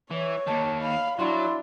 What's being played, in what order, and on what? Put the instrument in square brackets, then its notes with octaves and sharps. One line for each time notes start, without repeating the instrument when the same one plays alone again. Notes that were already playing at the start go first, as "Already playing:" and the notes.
[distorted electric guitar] E3 [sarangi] C#5
[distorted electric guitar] D#2 D#3 [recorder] A5
[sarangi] F5 [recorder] B5
[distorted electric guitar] F#3 [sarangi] D4 [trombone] E4 [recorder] C6